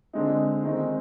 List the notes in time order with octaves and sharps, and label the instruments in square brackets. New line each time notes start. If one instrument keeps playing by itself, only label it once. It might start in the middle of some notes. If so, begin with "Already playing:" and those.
[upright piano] D3 G#3 C4 D#4
D#3 G#3 C4 D#4